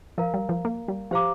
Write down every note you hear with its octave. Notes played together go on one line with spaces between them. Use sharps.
F3 A#4 F5 A#5
G3
F3
A#3
G3
F3 G4 C5 F5 A#5 D6